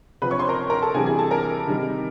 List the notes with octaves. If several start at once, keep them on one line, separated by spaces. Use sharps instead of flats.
C3 F3 B4 B5
C#5 C#6
C5 C6
A#4 A#5
A#4 A#5
A4 A5
C3 E3 G3 G#4 G#5
G#4 G#5
A4 A5
A#4 A#5
C3 D#3 G3